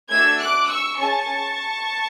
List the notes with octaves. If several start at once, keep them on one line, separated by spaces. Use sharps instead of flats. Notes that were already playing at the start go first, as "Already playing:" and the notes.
A3 D4 F#4 A4 E6 G#6
D6 F#6
C#6 E6
C#4 G#4 A5 C#6